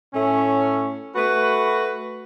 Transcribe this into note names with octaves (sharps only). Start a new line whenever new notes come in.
A2 A3 C#4
A3 F#4 B4